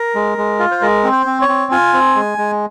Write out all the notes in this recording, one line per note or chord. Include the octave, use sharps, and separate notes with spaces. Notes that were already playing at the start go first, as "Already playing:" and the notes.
Already playing: A#4
G#3
G#3
F4
C5
G#3 A#4
C4
C5
C4
C#5
C4
F4 G#5
C4
G#3
G#3